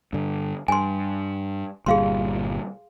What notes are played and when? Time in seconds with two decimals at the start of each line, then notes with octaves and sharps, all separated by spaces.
0.13 G2 D3
0.68 G2 G#5 C6
1.86 G1 A#2 G3 G#4 F5 C6